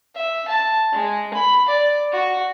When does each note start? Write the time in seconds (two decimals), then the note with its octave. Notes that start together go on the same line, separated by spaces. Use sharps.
0.15 E5
0.48 A5
0.93 G#3
1.34 B5
1.68 D5
2.13 F#4